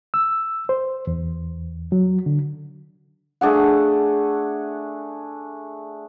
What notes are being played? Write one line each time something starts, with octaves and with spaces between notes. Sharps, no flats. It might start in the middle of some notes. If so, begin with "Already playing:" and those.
E6
C5
E2
F#3
D3
A3 D4 G#4 F#5